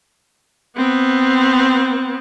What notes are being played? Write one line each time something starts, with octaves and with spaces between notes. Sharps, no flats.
B3 C4